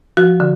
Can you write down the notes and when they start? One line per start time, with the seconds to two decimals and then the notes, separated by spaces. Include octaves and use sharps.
0.17 F3 F#4
0.40 D3